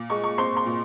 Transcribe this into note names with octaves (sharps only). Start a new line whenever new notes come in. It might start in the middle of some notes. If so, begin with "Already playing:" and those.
Already playing: A#2
G#3 C#6
C#6
C4 C6
C6
A#2